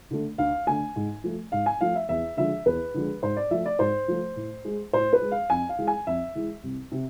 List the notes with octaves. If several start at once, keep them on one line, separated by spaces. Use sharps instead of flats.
D3 A3
D2 F5
D3 A3 G#5
G#2
F3 A3
G#2 F5
G#5
F3 A3 F5
E5
E2 E5
D3 F3 G#3 E5
E2 B4
D3 F3 G#3
G#2 C5
D5
F3 A3 E5
D5
G#2 C5
F3 A3
A2
G#3
A2 C5
B4
G#3
F5
F2 G#5
F5
E3 G#3
G#5
F2 E5
E3 G#3
C2
C3